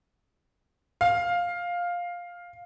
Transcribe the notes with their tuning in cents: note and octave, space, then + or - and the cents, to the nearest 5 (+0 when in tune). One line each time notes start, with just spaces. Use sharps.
F5 +10